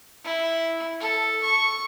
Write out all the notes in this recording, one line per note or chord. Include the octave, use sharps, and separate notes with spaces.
E4
A4
C#6